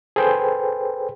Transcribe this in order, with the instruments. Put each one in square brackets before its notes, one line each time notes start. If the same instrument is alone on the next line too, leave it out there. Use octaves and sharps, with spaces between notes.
[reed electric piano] G#4 A4 B4 C5 G5